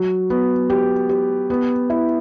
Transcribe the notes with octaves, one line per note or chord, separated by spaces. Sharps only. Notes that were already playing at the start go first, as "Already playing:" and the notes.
Already playing: F#3
B3
G4
G4
B3
E4